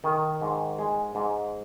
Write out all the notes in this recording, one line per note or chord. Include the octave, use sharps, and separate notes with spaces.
D#3
G#2
G#3
G#2